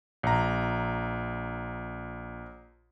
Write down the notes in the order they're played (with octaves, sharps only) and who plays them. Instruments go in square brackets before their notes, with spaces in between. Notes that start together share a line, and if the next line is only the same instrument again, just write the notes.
[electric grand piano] A#1 A#5